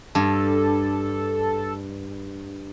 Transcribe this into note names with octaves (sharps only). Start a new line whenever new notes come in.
G2 A4